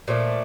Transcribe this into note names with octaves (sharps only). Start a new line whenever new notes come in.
A#2 F3 A3 D4